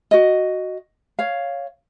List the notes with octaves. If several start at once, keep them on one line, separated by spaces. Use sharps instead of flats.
F#4 D#5
C#5 F5